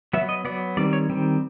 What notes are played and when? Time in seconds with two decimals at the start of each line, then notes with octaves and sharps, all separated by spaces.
0.13 F#3 B3 E5
0.29 D#5
0.45 F#3 B3 D5
0.77 D#3 G3 C4 D5
0.93 C#5
1.10 D#3 G3 C4